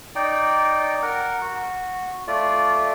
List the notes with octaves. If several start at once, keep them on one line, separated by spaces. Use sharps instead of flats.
D#4 D5 G5
A#4 F#5
F#4
A3 F4 D5